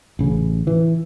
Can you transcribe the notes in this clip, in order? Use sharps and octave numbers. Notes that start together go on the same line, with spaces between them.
A1 C#3
E3